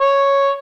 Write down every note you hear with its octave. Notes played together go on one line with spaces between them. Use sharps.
C#5